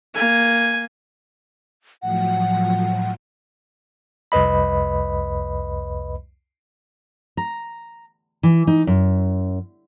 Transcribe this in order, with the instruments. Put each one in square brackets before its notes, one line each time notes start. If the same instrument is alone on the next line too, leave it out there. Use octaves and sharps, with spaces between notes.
[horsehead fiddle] A#3 [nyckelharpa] G#5
[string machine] A2 F3 F#3 [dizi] F#5
[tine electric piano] C2 F2 B4 D#5 B5
[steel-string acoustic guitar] A#5
E3
D#4
F#2